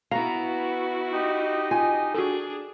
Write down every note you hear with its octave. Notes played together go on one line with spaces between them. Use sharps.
B3 E4 F#4 F5 A#5
D#4 G4 D#5
F4 G#5
D4 F#4 G#4 A4